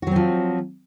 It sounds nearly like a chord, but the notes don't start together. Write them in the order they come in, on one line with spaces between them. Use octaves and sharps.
F#4 F#3 C4 F3